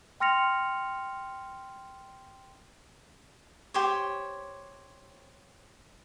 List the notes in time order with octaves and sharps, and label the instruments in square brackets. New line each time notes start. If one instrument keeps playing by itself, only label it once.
[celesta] G5 C6 F6 A#6 C#7 F7
[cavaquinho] G4 C5 C#5